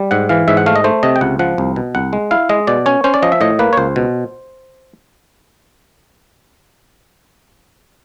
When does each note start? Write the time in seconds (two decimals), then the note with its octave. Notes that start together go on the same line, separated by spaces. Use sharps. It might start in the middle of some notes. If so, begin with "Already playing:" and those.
Already playing: G3
0.11 G#2 F#5
0.29 E3 F5
0.48 G#2 E5
0.57 F#5
0.66 A3 F5
0.76 D#5
0.84 A3 C5
1.03 C3 D#5
1.16 G5
1.21 C#2 F#5
1.39 F3 F#5
1.58 C2
1.76 B2
1.95 C2 F#5
2.13 G#3
2.31 E4 F5
2.49 G#3 D#5
2.67 B2 D5
2.86 C#4 C#5
3.04 C#4 C5
3.14 D5
3.23 F3 D#5
3.32 E5
3.41 A2 D#5
3.59 A#3 B4
3.73 C#5
3.77 C#2 C5
3.96 B2